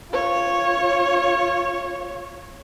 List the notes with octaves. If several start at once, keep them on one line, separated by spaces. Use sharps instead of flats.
F4 C#5